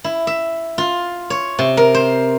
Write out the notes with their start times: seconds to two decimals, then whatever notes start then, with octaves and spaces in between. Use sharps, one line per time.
0.04 E4
0.27 E5
0.78 F4
1.30 C#5
1.59 C3
1.77 A#4
1.94 C5